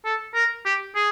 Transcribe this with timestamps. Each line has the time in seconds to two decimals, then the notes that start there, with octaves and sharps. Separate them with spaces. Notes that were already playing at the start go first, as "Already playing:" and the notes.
0.05 A4
0.35 A#4
0.65 G4
0.96 G#4